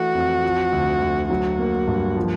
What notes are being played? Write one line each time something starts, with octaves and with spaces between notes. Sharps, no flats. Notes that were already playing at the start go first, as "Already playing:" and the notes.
Already playing: E3 A3 F#4
F2
F3
D2
D2
F#3 F#4
A#3
G2
F3